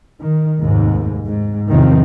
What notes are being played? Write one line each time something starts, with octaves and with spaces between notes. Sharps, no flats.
D#3
F1 D#2 G#2
G#2
E2 C3 D#3 F3 C4